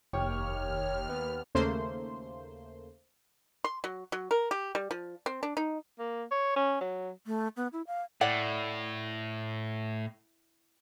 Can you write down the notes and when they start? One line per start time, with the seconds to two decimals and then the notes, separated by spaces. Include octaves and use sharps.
0.13 F1 D#2 G4 C#5 F6
1.09 B3
1.55 D#2 C#3 A3 A#3 C5 C6
3.64 C6
3.84 F#3
4.12 F#3
4.31 A#4
4.51 G4
4.75 G3
4.91 F3
5.26 C4
5.43 D4
5.57 D#4
5.99 A#3
6.31 C#5
6.56 C#4
6.81 F#3
7.26 A3
7.57 B3
7.73 E4
7.87 F5
8.21 A2 E4 D5 F#5